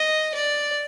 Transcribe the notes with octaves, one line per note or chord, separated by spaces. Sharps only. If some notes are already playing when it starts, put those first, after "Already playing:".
Already playing: D#5
D5